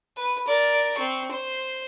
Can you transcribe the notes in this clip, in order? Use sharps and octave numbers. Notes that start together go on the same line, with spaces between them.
B4
A#4 D5
C4 C#6
C5